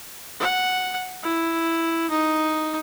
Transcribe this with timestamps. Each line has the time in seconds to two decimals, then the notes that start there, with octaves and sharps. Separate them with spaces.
0.40 F#5
1.23 E4
2.10 D#4